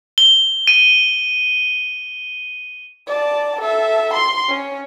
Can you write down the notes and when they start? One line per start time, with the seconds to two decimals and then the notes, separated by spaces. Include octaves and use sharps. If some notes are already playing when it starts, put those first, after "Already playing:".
0.18 G7
0.67 D#7
3.07 D5 A5
3.61 A4 E5
4.14 C6
4.49 C#4